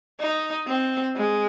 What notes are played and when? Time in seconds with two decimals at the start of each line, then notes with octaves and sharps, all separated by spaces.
0.20 D#4
0.67 C4
1.16 G#3